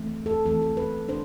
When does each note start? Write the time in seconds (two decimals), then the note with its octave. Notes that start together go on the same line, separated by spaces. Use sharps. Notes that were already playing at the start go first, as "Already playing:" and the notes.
Already playing: E3 A3 C4
0.26 A4
0.46 E3 A3 C4 A4
0.62 A4
0.77 B4
1.08 D4 C5